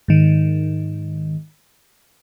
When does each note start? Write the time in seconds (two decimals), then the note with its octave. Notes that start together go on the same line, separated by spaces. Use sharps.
0.08 G#2 D#3